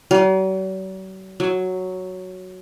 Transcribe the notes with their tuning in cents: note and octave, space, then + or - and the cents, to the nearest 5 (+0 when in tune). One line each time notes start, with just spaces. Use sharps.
F#3 +45
F#3 +0